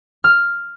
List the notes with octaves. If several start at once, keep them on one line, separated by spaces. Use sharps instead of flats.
F6